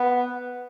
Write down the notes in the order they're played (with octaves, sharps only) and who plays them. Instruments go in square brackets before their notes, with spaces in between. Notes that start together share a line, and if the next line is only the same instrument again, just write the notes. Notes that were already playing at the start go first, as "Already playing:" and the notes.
Already playing: [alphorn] B3